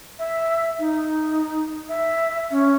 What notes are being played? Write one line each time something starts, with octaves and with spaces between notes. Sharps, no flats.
E5
D#4
E5
C#4